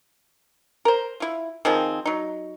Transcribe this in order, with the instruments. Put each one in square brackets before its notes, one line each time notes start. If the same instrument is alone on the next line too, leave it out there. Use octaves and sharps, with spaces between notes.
[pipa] A#4 C5
E4 F4
D#3 F3 C4 G#4
F#3 D#4